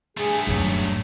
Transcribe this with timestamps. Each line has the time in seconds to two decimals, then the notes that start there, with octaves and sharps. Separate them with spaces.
0.17 G2 A3 G#4
0.47 F#1 A2 F#3